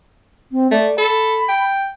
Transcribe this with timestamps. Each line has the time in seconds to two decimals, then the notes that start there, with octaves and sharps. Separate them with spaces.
0.52 C4
0.71 A3 D5
0.98 A4 B5
1.48 G5